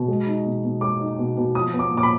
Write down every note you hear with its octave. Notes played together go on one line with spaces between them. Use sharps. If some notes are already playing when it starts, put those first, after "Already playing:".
Already playing: B2
G#3
D#4
B2
B2
G#3 D6
D#4
B2
B2
F3 D#6
B3
D6
A#2
D6
B5